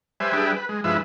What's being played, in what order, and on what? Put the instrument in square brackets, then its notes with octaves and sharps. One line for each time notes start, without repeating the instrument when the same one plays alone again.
[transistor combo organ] G3 B4 C5 E5 G#5
G3 D4 G4 G#4 B4 E5
B4
G#3
G2 F3 G#3 E4 B4 E5